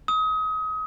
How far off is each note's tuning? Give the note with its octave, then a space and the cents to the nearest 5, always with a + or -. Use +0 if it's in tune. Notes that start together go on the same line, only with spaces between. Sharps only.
D#6 +30